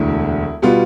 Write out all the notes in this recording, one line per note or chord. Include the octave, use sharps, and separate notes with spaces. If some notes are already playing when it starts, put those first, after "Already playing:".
Already playing: E1 D2 D3 E4
B2 G3 B3 F4